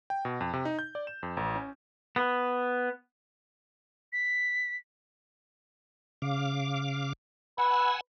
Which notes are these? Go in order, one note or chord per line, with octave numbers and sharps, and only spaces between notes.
G5
B2
F2
C3
D#4
G6
D5
E7
F2
A1
C#4
B3
B6
C#3 F5 D6
B4 F#5 G#5 E6